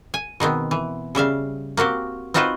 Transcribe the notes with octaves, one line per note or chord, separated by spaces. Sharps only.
G#5
B2 D#3 B3 C4
E3
C#3 G3 E5 F5
A#3 C4 F#4 G4
C4 D#4 F4 F#4 B4 C5